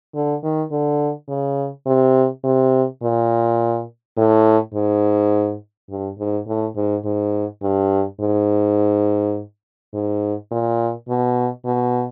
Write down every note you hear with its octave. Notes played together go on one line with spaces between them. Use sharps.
D3
D#3
D3
C#3
C3
C3
A#2
A2
G#2
G2
G#2
A2
G#2
G#2
G2
G#2
G#2
A#2
B2
B2